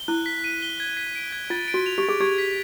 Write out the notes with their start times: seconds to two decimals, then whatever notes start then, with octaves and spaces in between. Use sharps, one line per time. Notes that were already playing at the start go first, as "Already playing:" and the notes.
Already playing: G7
0.08 E4 F#6
0.26 B6
0.44 D#7
0.62 G7
0.80 G#6
0.97 B6
1.16 D7
1.32 G#6
1.50 F4 A6
1.68 D7
1.74 F#4
1.86 F7
1.98 G4
2.03 A6
2.09 G#4
2.21 G4 G#6
2.38 B6